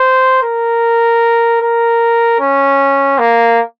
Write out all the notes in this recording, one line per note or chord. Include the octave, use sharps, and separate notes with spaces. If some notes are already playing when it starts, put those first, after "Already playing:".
Already playing: C5
A#4
A#4
C#4
A#3